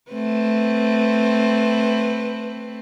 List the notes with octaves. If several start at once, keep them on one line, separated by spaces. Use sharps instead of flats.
A3 C4 B4